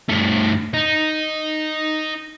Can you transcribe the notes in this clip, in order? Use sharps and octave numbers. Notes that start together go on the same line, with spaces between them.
G2 A3
D#4